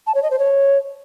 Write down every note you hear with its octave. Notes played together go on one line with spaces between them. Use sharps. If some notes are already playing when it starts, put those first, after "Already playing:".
A5
C#5
D#5
C5
C#5